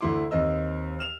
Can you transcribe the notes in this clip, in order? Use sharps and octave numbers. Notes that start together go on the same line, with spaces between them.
D2 A3 E4 C6 D6
D#2 C4 D#5 E6
F6 E7 F7